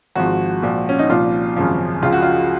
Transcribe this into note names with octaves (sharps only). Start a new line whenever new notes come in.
G#1 G#2 F3 F#4
A#1 A#2 F3
C#4
D#4
C2 A#2 F3 F4
G#1 F#2 C#3 F3
C#2 C#3 F3 F4
F#4
F4